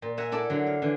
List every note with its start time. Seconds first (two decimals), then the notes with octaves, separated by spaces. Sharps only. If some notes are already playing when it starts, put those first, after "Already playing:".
0.02 A#2
0.17 E5 F#5 G#5 A#5
0.32 E4 A4 D5 A5
0.50 D3 F#3
0.67 F5
0.82 D3 E3